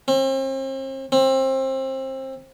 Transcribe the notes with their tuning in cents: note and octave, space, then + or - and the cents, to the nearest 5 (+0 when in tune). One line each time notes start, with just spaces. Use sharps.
C4 +40
C4 +25